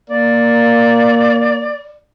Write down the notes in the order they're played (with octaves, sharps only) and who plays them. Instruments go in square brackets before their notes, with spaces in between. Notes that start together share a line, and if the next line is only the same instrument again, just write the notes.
[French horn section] A#3 [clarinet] D5